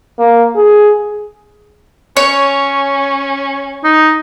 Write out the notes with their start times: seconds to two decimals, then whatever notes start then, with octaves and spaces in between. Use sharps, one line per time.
0.19 A#3
0.55 G#4
2.17 C#4 C#5
3.84 D#4